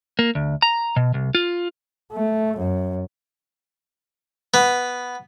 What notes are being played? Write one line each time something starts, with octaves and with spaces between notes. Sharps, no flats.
A#3
D2
A#5
B2
C2
F4
A3
F#2
B3